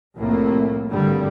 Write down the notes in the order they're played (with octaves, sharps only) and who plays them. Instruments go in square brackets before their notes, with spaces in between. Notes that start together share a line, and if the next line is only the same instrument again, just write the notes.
[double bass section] C2 F2 A2 A3 A#3
G#1 G2 D3 G3